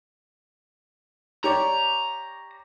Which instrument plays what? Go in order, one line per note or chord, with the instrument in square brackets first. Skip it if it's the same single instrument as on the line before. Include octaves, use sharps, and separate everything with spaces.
[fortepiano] G4 C#5 D5 [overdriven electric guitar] A#5